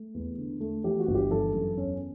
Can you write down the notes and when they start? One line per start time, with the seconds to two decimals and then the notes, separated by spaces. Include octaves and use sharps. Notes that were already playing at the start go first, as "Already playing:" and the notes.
Already playing: A3
0.14 E2
0.38 D3
0.60 A3
0.84 E3 G4
1.00 F#4
1.08 G1
1.15 G4
1.31 E3 A4
1.54 F#2
1.77 E2 C#4